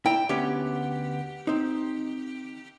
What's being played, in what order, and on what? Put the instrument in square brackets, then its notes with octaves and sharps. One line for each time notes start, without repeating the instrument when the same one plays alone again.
[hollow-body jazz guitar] E4 D5 A#5 [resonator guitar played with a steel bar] G5
[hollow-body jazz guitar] D2 B3 C#4 [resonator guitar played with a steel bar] G4
[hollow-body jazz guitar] C4 D#4